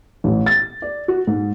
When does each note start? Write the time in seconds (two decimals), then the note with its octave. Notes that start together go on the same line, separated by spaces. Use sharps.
0.24 A1
0.46 A6
0.82 D5
1.08 F#4
1.27 G#2